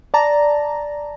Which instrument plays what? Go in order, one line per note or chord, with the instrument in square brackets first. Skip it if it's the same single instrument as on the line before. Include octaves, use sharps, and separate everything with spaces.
[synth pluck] D5 A5 A#5